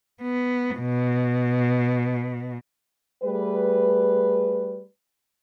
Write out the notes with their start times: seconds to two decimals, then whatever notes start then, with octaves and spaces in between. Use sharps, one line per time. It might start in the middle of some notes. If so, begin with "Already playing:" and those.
0.22 B3
0.78 B2
3.23 G3 A3 G#4 B4